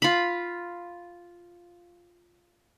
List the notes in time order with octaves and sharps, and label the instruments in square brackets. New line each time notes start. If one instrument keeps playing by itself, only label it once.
[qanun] F4 B5